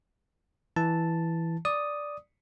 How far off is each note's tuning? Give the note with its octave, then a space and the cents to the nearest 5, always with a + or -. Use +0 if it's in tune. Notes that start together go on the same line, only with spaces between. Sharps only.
E3 +0 A5 +0
D5 +0 D#6 +0